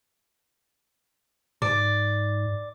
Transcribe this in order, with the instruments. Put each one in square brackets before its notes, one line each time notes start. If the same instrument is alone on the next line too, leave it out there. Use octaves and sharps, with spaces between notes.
[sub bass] G#2 [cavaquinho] D5